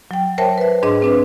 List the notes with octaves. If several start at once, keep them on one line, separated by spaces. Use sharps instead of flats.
F#3 G5
A#4 C5 C#5 E5 G5 A5
B4 E5
G#2 D4 G#4 D#5 C6
C4 D4 B4